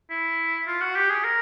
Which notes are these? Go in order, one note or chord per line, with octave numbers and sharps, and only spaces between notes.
E4
F4
F#4
G4
G#4
A#4